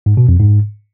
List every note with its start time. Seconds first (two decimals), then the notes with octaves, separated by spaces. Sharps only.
0.06 G#2
0.17 B2
0.29 F2
0.40 G#2